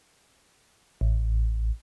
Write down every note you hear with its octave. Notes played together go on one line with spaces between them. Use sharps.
A1